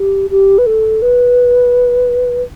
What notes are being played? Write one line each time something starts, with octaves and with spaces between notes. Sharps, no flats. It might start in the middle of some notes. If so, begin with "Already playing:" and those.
Already playing: G4
G4
B4
A4
B4